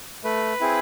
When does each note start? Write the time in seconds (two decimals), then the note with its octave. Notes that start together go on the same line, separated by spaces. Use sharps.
0.24 A3 B4
0.61 C4 E4 G#4